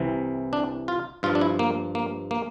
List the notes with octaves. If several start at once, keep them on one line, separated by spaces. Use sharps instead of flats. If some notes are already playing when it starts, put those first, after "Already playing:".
Already playing: C2 C3 E3
D4
F4
G2 F3 F4
D4
E4
A#3
A#3
A#3